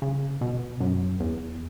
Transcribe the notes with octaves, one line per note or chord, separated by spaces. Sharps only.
C#3
B2
F#2
E2